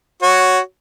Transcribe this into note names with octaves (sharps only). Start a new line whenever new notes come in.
F#4 C#5